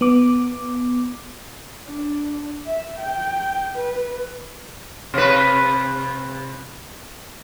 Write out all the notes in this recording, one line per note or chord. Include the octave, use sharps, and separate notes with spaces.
B3 D6
D4
E5
G5
B4
C3 B4